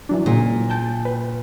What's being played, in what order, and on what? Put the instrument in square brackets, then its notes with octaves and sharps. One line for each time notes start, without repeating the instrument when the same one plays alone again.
[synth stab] E3 F#3 D4
[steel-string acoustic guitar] A#2 [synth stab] C#3 F#3 G#3
[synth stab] G5 A5 G6
B4